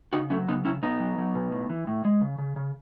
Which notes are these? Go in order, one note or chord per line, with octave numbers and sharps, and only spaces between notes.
C#3 D#4 F#4
F#3 A3 C#4
C#3 B3 D#4
C#3 C#4 E4
B2 B3 D#4
F#3
F#3
B2
A2
E3
A2
G#3
C#3
C#3
C#3